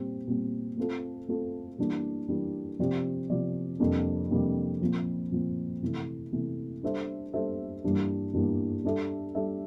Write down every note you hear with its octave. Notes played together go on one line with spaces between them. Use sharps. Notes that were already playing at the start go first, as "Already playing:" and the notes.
Already playing: A#2 G3 C4
A#2 G3 C4
A3 C4 F4 A4
A3 C4 F4 A4
E3 G3 A#3 D4
E3 G3 A#3 D4
C3 F3 C4 G4 D5
C3 F3 C4 G4 D5
F2 C3 G3 A#3 D4
F2 C3 G3 A#3 D4
A#2 F3 C4
A#2 F3 C4
C3 E3 A3
C3 E3 A3
G3 D4 A4 C5 E5
G3 D4 A4 C5 E5
G2 E3 G3 A#3 D4
G2 E3 G3 A#3 D4
G3 D4 A4 E5
G3 D4 A4 E5